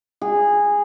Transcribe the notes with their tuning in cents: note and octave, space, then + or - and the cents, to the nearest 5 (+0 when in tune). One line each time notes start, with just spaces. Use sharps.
G#4 -15